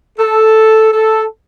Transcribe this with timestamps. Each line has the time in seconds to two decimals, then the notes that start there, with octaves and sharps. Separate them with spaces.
0.19 A4
0.92 A4